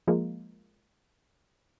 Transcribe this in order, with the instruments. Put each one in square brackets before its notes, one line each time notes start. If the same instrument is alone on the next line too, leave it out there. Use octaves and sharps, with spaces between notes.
[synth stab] F3 G#3 A#3